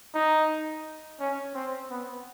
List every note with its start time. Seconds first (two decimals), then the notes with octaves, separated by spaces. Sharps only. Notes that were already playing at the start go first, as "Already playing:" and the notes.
0.15 D#4
1.20 C#4
1.55 C4
1.90 B3